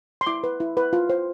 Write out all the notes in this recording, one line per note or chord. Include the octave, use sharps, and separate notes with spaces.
C6
E4 D6
B4
E4
B4
F4
C5